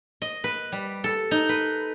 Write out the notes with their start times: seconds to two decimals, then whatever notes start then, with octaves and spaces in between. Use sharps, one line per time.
0.22 D#5
0.44 B4
0.72 G3
1.04 A4
1.31 D#4
1.49 B4